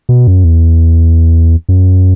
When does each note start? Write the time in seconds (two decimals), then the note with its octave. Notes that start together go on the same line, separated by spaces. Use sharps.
0.09 B2
0.27 F#2
0.44 E2
1.69 F#2